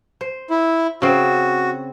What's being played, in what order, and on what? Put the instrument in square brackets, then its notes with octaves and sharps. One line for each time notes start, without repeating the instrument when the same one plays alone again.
[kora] C5
[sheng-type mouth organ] E4
[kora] C#3 C4 [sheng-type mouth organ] F#4